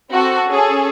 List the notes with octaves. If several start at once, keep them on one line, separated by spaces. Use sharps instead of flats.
C4 F#4 A4
C#4 G#4 A4